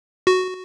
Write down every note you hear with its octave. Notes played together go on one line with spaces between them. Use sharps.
F#4